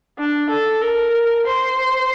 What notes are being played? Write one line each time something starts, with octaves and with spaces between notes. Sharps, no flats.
D4
A4
A#4
C5